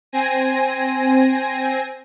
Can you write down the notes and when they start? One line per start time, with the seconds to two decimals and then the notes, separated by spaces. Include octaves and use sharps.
0.12 C4 G#5 A#6 D#7